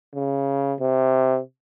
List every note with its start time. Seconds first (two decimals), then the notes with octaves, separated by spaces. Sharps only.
0.15 C#3
0.80 C3